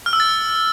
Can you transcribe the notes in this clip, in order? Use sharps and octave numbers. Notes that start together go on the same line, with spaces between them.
F6
E6
A6